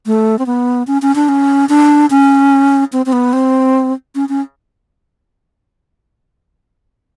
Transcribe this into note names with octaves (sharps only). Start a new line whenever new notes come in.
A3
C4
B3
C#4
C#4
D4
C#4
D4
C#4
C4
C4
B3
C4
C#4
C#4